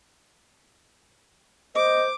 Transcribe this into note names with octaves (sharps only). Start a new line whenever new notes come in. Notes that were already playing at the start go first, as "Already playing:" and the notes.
C5 D#5 D6